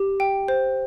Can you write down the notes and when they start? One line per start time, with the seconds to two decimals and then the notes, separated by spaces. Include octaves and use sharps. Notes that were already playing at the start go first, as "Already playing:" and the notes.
Already playing: G4
0.20 G5
0.48 C5